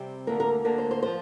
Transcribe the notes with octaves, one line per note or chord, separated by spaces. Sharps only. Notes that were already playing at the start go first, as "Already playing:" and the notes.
Already playing: C3 G3 C4
D2 D3 A#3 A#4
A#4
D2 D3 A#3 A#4
C5
C5
F3 C5